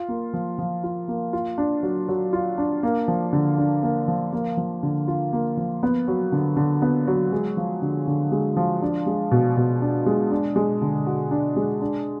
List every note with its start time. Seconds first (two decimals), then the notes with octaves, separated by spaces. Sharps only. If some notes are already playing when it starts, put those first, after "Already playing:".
Already playing: F4
0.09 A#3
0.33 F3
0.59 F3
0.84 F4
1.08 A#3
1.33 F4
1.58 D4
1.83 F#3
2.09 F#3
2.33 F4
2.58 D4
2.83 A#3
3.08 F3
3.33 D3
3.58 D4
3.83 A#3
4.08 F3
4.32 A#3
4.57 F3
4.83 D3
5.08 F4
5.33 A#3
5.57 F3
5.83 B3
6.08 F#3
6.32 D3
6.57 D3
6.82 B3
7.07 F#3
7.32 G#3
7.57 F3
7.82 D3
8.07 D3
8.32 G#3
8.56 F3
8.82 D4
9.06 G#3
9.31 B2
9.57 B2
9.82 D4
10.06 G#3
10.31 D4
10.56 G#3
10.82 D3
11.07 F#4
11.31 D4
11.56 G#3
11.81 D4